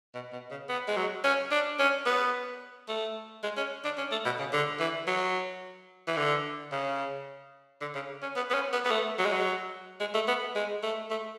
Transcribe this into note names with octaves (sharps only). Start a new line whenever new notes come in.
B2
B2
C#3
B3
G#3
F#3
C#4
D4
C#4
B3
A3
G#3
C#4
D4
C#4
A3
B2
C#3
D3
E3
F#3
E3
D3
C#3
D3
C#3
C#4
B3
B3
C#4
B3
B3
A3
F#3
G#3
F#3
G#3
A3
B3
G#3
A3
A3